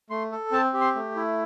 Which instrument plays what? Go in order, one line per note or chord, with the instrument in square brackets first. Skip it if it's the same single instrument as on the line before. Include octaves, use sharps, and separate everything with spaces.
[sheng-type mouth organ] A3 C6
A4
C4 A5
G4
C6
A3
E4